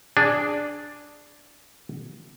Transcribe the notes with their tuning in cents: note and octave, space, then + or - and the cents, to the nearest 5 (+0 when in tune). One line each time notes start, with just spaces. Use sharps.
D4 +0 G#4 +0